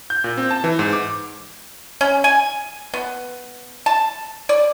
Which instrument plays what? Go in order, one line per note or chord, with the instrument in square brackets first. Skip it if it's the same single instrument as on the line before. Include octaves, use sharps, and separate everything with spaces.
[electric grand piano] G6
A#2
C4
A5
E3
G#2
D6
[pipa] C#4
G#5
B3
A5
D5